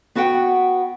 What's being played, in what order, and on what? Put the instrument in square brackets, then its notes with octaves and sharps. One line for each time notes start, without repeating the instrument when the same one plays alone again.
[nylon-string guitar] B3 F#4 B4 F#5 G5